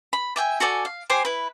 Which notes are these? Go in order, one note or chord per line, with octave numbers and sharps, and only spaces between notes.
B5
D5 E5 G5 G#5
F#4 A4 D5 G#5
F5
G4 C5 G#5 C6
E4 B4